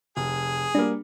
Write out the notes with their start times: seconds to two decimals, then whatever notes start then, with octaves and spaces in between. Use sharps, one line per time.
0.17 F1 G#4
0.75 G3 A#3 D4